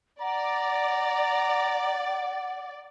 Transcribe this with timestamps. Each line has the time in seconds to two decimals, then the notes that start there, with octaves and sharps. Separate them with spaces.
0.21 D5 F#5 A#5